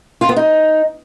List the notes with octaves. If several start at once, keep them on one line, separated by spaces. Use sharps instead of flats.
F4
B3
D#4